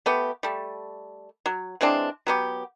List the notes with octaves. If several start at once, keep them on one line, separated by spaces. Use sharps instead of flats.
A3 B3 G4
G3 A3
F#3
E3 G#3 C4 D4
F#3 B3 G4